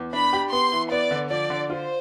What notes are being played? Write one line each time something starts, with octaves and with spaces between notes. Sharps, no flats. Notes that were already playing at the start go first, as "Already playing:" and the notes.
Already playing: E2
D4 B5
G4
B3 C6
E3
B3 D5
D3
F3 D5
D3
F4 C5